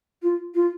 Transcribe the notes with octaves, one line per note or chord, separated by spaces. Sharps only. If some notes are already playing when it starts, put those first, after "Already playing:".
F4
F4